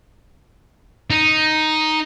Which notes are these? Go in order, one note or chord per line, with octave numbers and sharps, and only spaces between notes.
D#4